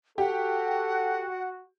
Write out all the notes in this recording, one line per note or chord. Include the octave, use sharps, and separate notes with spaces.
F#4 G4 A4 F#5